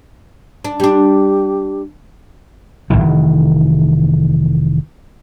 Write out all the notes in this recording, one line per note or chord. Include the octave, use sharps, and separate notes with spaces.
D4
G3 D4 G4
F1 D2 D#3 E3